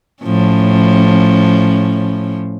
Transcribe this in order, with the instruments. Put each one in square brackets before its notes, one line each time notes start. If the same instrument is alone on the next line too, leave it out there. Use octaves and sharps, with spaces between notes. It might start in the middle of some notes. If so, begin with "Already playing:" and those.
[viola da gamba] A2 F3 C#4